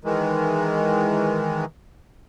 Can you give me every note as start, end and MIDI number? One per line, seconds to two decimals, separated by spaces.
0.04 1.65 51
0.04 1.65 52
0.04 1.65 56